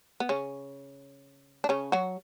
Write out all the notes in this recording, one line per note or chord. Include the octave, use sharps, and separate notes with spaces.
B3
C#3 C#4
D4
C#3 C#4
F#3 F#4